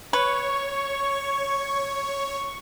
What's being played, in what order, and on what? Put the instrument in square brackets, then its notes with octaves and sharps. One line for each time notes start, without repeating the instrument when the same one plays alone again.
[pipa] B4 [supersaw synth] C#5 [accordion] C#6